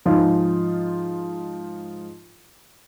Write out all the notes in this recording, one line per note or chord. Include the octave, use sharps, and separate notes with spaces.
G#2 F3 D#4 F4